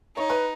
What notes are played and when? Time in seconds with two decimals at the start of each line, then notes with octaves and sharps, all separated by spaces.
0.17 D#4 C#5
0.30 B4